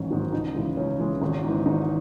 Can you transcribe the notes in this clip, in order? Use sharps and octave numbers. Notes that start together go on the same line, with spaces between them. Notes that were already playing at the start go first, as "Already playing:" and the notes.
Already playing: A1 G#2 D#3 F#3 C#4
G#2 D#3 F#3
C#2 D#4
C#3 E3 G#3
C#2 C#4
C#3 E3 G#3
G#1 C#4
G#2 E3
G#1 D#4